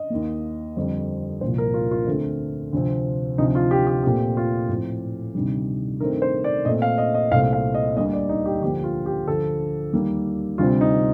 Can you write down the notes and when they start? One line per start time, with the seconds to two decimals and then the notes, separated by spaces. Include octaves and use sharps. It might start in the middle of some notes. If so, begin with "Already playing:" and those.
Already playing: D#5
0.10 D#2 D#3 A#3
0.76 F2 D3 G3 C4
1.41 C2 A#2 F3 C5
1.58 A#4
1.74 F4
1.91 F4
2.07 D2 D3 A3 C4
2.73 D2 C3 F3 C4
3.38 D2 C3 F3 D#4
3.55 F4
3.71 G4
3.87 G4
4.03 A#2 A3 C4 G4
4.37 F4
4.69 A2 F3 C4
5.35 D2 C3 D#3 G3
6.00 G2 D#3 A3 C4 A#4
6.22 C5
6.44 D5
6.65 A#2 A3 C4 D#5
6.82 F5
6.98 D#5
7.14 D#5
7.31 C2 A#2 A3 C4 F5
7.53 F5
7.74 D#5
7.96 D2 D3 G3 A#3 D#5
8.13 D5
8.29 D#4
8.46 G4
8.61 D2 D3 F3 A#3 G4
8.84 F4
9.06 G4
9.27 D2 D3 F3 A4
9.93 D#2 D#3 G3 A#3
10.58 D2 C3 G3 C4 F4
10.81 D#4